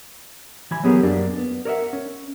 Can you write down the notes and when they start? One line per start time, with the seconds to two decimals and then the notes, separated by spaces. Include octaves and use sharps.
0.71 E3 G#5 B5
0.84 F#3 B3 G4 G#4 A#4
1.03 F#2 A#3 D4
1.38 B3
1.65 A#4 C#5 D5 E5 F#5
1.93 C#4